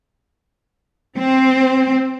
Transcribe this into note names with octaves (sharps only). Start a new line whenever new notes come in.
C4